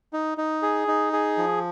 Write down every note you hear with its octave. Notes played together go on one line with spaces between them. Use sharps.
D#4
D#4
G#4
D#4
G#4
F3